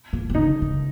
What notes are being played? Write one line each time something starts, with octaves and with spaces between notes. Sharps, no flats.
A#2
A#2
C#3 D#4
C#3